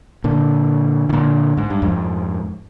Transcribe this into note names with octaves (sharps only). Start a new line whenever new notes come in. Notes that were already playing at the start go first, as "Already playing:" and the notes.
A#2 D3
D#3
A#2 D3
G#2
G2
F2 G#2